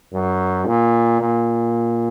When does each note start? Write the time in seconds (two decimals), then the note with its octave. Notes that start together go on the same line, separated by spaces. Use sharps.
0.13 F#2
0.67 A#2
1.20 A#2